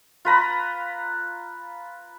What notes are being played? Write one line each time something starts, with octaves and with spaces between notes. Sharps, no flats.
F4 B4 A#5 B5